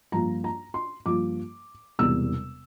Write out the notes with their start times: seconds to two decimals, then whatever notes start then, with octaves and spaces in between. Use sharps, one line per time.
0.12 G2 F3 A#3 F4 A#5
0.44 A#5
0.74 C6
1.06 G2 F3 A#3 F4 D6
1.99 E1 E2 C3 G3 E6